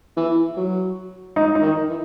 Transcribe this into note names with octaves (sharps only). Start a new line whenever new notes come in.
E3
F#3
D#4
D#4
D#3
E3